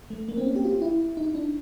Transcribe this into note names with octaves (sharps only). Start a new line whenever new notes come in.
A3
A#3
C4
C#4
G4
F4
E4
D#4
D4